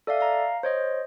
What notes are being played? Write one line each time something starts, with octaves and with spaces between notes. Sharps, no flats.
A4 D5 E5 F5
F5 A#5
C5 C#5 D#5